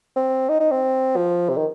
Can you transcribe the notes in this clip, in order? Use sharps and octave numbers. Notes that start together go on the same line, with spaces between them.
C4
D#4
D#4
C4
F3
C3
D#3